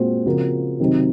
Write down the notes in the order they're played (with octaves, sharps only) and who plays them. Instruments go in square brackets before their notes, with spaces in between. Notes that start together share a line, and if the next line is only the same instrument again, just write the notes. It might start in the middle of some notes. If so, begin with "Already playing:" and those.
Already playing: [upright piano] A#2 G#3 C4 F#4 C5
C#3 F3 C4 F#4 A#4
C3 D#3 F#3 C4 D#4